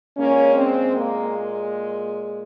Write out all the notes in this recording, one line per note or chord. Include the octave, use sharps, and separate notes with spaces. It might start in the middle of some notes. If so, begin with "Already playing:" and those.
A#2 G#3 A#3 C#4
C4
A#3